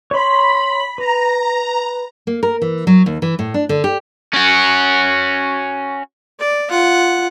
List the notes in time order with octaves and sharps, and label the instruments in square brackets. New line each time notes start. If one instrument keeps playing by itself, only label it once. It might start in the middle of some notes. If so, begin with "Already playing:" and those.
[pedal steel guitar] C#5 C6 [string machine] B5
[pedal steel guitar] B4 [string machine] A#5
[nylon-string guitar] A#3
A#4
E3
F#3
D#2
E3
A2
D4
D3
G4
[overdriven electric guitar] C#4 F#4
[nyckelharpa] D5
F4 F#5